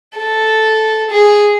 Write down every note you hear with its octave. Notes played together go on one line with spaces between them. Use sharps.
A4
G#4